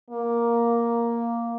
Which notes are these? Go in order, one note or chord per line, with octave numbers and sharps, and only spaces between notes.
A#3